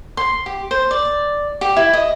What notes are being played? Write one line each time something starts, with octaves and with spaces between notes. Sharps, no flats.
C6
G4
C5
D5
G4
E4
D#5